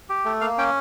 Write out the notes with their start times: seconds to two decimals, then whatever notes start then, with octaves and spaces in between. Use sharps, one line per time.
0.09 G4
0.25 A3
0.41 A#3 F5
0.58 C#4 G5